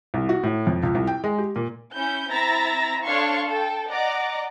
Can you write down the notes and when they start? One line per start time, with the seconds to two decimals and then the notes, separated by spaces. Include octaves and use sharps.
0.14 C2
0.29 F#4
0.43 A2
0.67 F2
0.83 C#2
0.95 C2
1.07 G5
1.24 G#3
1.38 G4
1.56 A#2
1.93 C#4 E4 G6
2.30 C4 E4 E5 A#5 A6 A#6
3.04 D4 A4 C#5 F5 C6 C#6
3.45 A4 G5
3.89 D5 D#5 F#5 A#5 D6